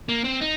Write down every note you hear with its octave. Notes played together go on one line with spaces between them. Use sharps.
A#3
C4
D#4